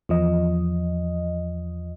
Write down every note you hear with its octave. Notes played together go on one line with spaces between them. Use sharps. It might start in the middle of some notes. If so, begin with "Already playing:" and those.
E2 F3 D#5